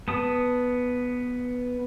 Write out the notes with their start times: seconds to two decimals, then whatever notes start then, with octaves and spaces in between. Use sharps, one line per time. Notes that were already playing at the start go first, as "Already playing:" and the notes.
0.08 B3 A5 D#6